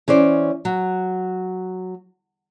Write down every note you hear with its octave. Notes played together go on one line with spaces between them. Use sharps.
E3 C#4 C5 D5
F#3